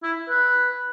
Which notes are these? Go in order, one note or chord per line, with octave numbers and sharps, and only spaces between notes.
E4
B4